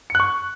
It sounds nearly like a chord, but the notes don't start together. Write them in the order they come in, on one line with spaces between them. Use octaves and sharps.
C#7 F#6 C#6